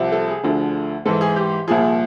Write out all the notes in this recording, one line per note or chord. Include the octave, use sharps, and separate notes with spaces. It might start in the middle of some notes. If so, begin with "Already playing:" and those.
Already playing: C2 C3 F3
A4
G#4
D2 D3 F3
G#2 E3 A4
G#4
G4
C2 A#2 F3 G#4